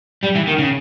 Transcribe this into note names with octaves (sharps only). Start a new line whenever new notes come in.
G3
E3
D#3
C#3